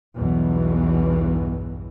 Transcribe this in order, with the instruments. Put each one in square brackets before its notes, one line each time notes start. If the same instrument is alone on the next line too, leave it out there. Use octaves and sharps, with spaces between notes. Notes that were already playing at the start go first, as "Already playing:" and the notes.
[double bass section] B1 E2 G2 B2 E3